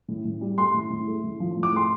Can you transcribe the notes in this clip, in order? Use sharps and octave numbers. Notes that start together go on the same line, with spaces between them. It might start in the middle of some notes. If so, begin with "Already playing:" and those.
A2
A2
G3
A3 C6
A2
A2
A3
A2
F3
A2
D6
A3 C6